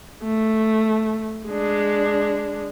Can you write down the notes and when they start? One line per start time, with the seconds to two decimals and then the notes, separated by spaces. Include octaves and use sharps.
0.23 A3
1.49 G#3 D4